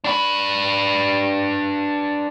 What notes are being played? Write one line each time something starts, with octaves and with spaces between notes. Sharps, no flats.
D4 B4